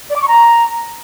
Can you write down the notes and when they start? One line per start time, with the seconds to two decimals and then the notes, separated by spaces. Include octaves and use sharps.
0.10 D5
0.16 D6
0.22 C#6
0.28 A#5